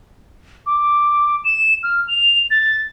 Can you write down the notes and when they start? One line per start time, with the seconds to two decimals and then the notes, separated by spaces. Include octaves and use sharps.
0.66 D6
1.45 E7
1.83 F6
2.08 F7
2.50 A6